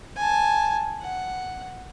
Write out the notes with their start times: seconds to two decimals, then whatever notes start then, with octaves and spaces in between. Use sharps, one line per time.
0.17 G#5 A5
1.00 F#5